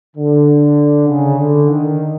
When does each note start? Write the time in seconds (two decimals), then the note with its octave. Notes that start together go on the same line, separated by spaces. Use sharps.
0.16 D3
1.08 C#3
1.39 D3
1.69 D#3